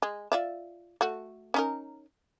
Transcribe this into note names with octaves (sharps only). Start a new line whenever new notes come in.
G#3
F4 D5 E5
A3 F#4
C#4 D#4 A#4